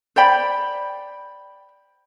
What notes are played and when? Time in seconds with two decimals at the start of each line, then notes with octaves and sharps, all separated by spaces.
0.16 C5 D5 G5 B5